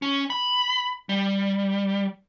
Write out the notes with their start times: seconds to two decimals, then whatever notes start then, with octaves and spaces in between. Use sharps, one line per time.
0.02 C#4
0.30 B5
1.09 G3